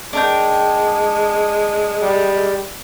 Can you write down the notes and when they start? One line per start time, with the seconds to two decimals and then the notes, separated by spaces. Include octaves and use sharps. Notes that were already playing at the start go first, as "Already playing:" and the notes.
0.13 G#3 D4 A#4 G5
2.02 G3